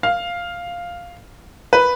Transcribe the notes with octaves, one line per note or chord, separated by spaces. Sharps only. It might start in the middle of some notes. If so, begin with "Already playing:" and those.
F5
B4